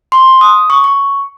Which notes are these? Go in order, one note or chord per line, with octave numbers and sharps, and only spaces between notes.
C6
D#6
C#6
C#6